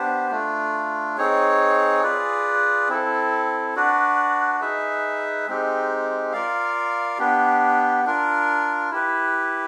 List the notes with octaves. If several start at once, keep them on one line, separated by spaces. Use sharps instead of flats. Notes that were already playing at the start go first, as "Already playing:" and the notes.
Already playing: B3 D4 G4 C5
A3 D4 F4
C4 D#4 G#4 C#5
F4 G#4 B4 D5
C4 E4 A4
D4 F#4 B4 D5
D#4 G#4 B4 E5
G#3 C4 D#4 G4
F4 A#4 D5 F5
B3 D4 G4
D4 F4 A#4
E4 G4 B4